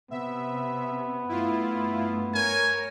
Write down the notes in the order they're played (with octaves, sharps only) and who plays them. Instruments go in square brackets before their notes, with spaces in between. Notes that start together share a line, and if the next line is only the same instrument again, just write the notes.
[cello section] C3 [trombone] B3 [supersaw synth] E5
[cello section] G2 A3 [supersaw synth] E4 F4
[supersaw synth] A#4 C#5 [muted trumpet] G#5